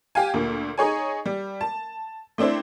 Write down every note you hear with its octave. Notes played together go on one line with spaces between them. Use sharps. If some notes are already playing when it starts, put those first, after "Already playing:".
G4 F5 G#5
D2 A#2
D#4 G#4 C#5 G#5
G3
A5
A3 C4 D4 E4 C5